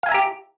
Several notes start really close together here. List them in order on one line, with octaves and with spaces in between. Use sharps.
F5 G#5 E5 A#5 G4